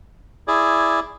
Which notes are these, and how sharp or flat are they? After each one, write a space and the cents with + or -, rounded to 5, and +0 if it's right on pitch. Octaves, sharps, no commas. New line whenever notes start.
E4 +5 G#4 +0 D5 +0